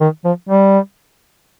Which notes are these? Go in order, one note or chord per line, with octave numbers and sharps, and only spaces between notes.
D#3
F3
G3